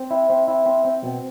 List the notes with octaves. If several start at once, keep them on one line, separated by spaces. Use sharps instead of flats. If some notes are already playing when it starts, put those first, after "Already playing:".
Already playing: C4
E4
C4
E4
C4
C4
B2